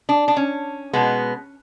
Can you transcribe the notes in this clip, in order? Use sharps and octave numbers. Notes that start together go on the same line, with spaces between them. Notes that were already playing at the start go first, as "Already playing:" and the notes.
D4
D4
C#4
B2 G#3 B3